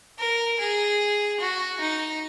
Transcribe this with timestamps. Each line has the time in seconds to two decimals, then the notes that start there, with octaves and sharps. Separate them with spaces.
0.19 A#4
0.60 G#4
1.40 F#4
1.80 D#4